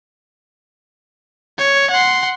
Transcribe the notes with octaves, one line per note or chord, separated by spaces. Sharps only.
C#5
F#5 C6